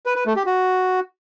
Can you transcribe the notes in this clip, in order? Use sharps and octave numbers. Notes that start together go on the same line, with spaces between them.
B4
B4
A3
G4
F#4